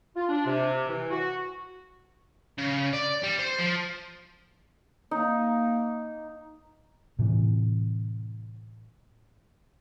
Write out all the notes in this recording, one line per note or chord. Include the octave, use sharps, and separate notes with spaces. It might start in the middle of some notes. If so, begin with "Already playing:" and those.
F4
D4
C3
E3
F#4
C#3
D5
G3
C5
F3
A#3 D#4
A2 C3 E3